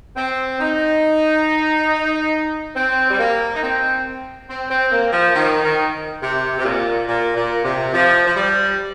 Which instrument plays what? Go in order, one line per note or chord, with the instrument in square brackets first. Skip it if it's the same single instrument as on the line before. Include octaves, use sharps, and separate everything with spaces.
[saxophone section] C4
D#4
C4
G3
A#3
D#4
C4
C4
C4
A#3
F3
D#3
D#3
C3
C3
A#2
A#2
A#2
C3
F3
F3
G3